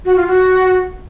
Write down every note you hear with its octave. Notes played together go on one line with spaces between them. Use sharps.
F#4
F4
F#4